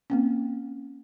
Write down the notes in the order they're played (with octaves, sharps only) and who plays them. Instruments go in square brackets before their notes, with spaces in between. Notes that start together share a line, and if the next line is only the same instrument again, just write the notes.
[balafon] A#3 C4 C#4